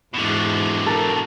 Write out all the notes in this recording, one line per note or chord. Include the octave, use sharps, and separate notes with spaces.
E2 G#2 B2 D3
A4 A#4